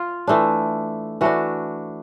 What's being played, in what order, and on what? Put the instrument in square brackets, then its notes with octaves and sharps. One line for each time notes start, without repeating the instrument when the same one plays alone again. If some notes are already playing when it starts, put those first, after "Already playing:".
Already playing: [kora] F4
E3 A3 D4
E3 A3 D4 F#4